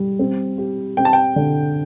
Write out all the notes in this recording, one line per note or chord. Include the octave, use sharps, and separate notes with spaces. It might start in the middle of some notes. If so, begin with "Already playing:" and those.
Already playing: G3
C4
G4
C4 G5
A5
G5
D3